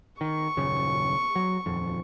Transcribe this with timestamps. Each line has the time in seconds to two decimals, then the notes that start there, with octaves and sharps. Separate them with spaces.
0.21 D#3 C#6
0.57 D#1 F#2 C#3
1.36 F#3
1.66 D#1 F2